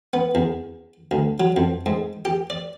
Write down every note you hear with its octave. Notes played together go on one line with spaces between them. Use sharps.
B3
E2
D2
F#3
F2
G#2
G4
D5